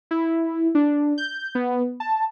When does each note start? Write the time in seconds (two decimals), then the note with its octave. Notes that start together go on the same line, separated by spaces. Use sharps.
0.11 E4
0.75 D4
1.18 G6
1.55 B3
2.00 A5